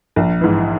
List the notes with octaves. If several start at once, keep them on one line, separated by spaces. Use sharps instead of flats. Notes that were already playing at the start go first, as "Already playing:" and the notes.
A#1
G#2 E3